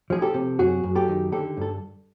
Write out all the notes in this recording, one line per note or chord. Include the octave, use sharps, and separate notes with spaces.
F3 G#4
G4 A4
C3
F#2 F#4 G#4
F#2
G4 A4
D#3
D3 G4 A4
G2 A4